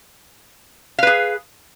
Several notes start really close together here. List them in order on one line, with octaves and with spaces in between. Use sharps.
F5 B4 G#4